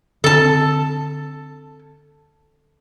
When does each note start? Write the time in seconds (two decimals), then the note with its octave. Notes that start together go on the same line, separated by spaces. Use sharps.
0.24 D3 C4 A4 A5